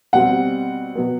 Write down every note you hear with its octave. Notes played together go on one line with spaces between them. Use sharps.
B2 G3 C4 F#5
B2 F#3 B3